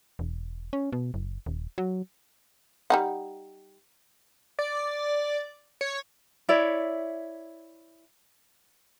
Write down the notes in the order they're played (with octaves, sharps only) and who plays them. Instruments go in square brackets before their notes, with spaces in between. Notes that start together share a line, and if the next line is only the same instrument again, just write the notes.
[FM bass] E1
C#4
B2
F#1
D#1
F#3
[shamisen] G3 D#4 F#5
[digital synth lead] D5
C#5
[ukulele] E4 C#5 D5 E5